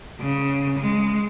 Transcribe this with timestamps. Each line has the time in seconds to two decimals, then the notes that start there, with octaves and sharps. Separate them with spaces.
0.20 C#3
0.78 G#3